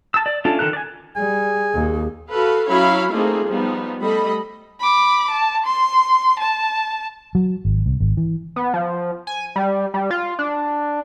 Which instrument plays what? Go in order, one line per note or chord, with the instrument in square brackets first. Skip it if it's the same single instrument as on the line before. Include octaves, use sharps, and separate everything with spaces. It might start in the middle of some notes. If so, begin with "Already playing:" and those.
[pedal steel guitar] A5 E6
D5
C#4 D4 E4 F4 A4
D3 D#3 A4 A#4 F#6
D5 G#5
[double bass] G3 [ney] G#4 [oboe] G#5
[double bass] D#2
[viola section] F#4 A4 B4 F5
F#3 C#4 E4 C#5 F5 B5
A3 A#3 C4 D#4 F4 G#4
F3 G3 B3 D#4
G3 A3 A4 D#5 B5
[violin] B5 D6
A5
C6
A5
[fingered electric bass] F#3
G#1
C2
G#1
E3
[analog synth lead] B3
F3
G#5
G3
G3
F4
D4